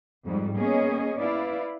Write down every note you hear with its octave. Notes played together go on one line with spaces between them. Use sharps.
F2 G#2 G3
A#3 B3 C#4 G#4 C#5 D#5
E4 B4 D5 F5